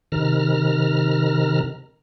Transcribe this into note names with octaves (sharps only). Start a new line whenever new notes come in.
C3 D#3 A#5 F6